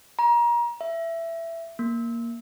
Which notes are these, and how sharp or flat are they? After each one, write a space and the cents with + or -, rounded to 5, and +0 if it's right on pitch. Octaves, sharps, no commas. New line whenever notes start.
A#5 +30
E5 +15
A#3 +0